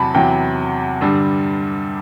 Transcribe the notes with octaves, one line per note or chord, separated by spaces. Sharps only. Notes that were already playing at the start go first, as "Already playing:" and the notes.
Already playing: E2 C3 F#3 A5 B5
E2 C3 F#3 G5
G2 D3 G3